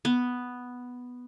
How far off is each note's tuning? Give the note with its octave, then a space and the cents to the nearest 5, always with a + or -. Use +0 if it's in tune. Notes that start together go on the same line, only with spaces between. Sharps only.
B3 +0